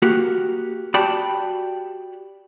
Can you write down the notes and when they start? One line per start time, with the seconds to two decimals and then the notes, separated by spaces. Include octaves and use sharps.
0.02 A#3 F#4 G4 A#4
0.94 F#4 G4 D5 G5 A5 B5